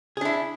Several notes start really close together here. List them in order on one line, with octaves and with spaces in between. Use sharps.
G#4 D4 E4